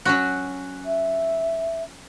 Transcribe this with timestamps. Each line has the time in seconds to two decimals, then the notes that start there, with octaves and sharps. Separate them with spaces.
0.05 F#3 C#4 F#4
0.85 E5